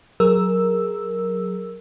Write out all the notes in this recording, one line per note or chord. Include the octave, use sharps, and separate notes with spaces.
F#3 G#4 A#4 E6